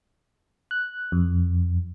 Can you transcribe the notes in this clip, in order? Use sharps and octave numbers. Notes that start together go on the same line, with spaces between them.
F#6
F2